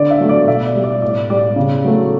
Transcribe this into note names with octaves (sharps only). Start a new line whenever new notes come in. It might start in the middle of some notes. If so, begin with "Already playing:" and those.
Already playing: D3 D5
E5
F#3 A3
D5
B2 E5
D5
G3
D5
A2 D5
G3 D5
C#3
F#3 A3